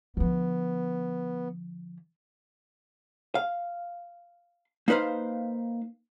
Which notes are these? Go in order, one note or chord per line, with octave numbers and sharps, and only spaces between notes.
D3 F3 B3
F5
A#3 D#4 B4 C5 F5